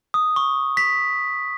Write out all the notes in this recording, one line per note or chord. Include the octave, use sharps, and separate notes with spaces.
D#6
C#6
B6